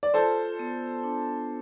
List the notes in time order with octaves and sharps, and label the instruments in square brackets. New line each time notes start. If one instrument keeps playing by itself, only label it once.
[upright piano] D5
[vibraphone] F4 [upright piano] A4 C5
[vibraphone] B3
D4